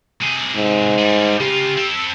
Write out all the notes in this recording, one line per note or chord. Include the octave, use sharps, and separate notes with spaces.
C3 G#4
G#2
G3 G#4
C#3 F4 G4
C4 A4